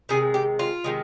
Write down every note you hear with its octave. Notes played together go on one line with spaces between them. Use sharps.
C3 D#3 G#3 G#4
G4
F4
C3 D#3 G#3